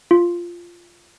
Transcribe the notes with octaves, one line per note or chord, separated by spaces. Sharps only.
F4